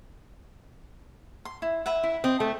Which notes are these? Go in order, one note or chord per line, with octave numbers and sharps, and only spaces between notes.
C6
E4
B4 E5 F#5
E4
C4 D#5
A3